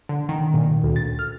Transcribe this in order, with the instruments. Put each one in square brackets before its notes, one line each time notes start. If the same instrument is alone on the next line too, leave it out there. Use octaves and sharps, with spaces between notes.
[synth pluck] D3
D#3
A#2
D2
A6
F6